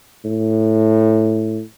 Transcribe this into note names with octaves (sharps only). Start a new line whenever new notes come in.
A2